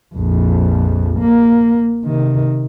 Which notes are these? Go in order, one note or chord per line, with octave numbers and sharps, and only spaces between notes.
A#1 F2
A#3
C3 D#3